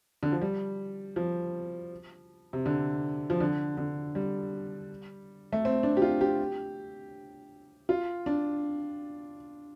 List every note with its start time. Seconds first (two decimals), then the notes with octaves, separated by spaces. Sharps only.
0.23 D3
0.32 F3
0.42 G3
1.16 F3
2.53 C3
2.66 D3
3.30 F3
3.40 D3
3.77 D3
4.15 G3
5.53 A3
5.65 C4
5.83 D4
5.97 G4
6.02 F4
6.21 G4
7.89 F4
8.26 D4